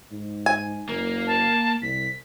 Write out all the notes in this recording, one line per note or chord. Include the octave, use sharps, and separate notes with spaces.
G#2
G#5
F#1 A#3
A5
C2 B6